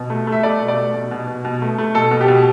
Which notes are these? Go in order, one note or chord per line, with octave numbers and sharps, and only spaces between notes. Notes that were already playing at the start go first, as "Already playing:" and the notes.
Already playing: B2
A3
A3
E5
A3 D5
B2
D5
A3
B2
B2
B2
B2
A3
A3
B2 A4
B2
G4
B2